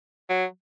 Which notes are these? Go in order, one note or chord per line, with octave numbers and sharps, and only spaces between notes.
F#3